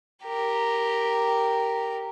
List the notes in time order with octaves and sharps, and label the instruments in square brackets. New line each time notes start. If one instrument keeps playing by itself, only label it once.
[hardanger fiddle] G4 A#4